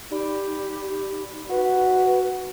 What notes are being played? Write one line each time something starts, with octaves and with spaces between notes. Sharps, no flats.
D#4 G4 D5 B5
F#4 B4